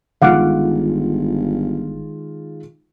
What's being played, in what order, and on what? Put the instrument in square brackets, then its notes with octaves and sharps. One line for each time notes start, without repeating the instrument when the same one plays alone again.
[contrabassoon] G1 [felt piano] D#3 G#3 F4 [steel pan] F5 F#5 D6